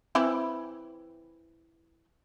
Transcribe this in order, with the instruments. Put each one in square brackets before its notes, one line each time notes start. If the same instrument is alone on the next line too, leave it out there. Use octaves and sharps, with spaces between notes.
[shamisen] E3 C4 E4